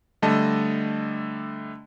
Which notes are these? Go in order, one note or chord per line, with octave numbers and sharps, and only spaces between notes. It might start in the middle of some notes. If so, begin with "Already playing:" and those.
D3 G3 A3 D#5 A5